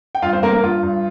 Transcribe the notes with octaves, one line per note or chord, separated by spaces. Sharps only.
G5
G2 F4 F5
C4 C5
G2 A#3 A#4
A#3 A#4
G2 F4
G2